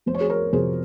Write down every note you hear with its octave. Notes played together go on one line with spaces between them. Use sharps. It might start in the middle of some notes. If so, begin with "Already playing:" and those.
F1 C5
C#5
G#4 C5
A#4 C#5
F2 C3 G#4 C5